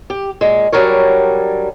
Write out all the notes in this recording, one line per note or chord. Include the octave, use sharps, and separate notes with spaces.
G4
A#2 G#3
F#3 G3 D4 A#4 C#5